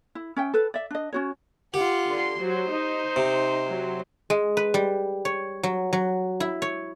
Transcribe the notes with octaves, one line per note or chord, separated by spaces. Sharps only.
E4
C#4 E5 G5
A4 B4
D5 E5
D4 D#5
C#4 F#4 C#5
F4 G4 F#5
D3 C6
F#3 C5
D#4
C3
F#3
G#3
B4
G3
C#5
F#3
F#3
E4
C#5